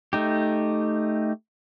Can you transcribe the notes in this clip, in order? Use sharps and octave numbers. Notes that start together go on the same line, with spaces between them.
A3 D#4 G4